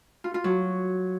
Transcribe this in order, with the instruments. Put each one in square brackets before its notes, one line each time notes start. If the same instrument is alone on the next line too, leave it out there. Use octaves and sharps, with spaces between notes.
[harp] F4
F4
F#3